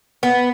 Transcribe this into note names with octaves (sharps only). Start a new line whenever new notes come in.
B3